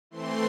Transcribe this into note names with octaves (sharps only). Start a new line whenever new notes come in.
E3 A3 C4 C6